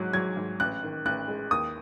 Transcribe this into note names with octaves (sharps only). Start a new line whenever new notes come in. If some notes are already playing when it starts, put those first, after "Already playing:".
Already playing: G#2 F#3 F#6
F#3 G#6
G#2
A1 F#6
D#3
A1 F#6
G#3
D#2 D#6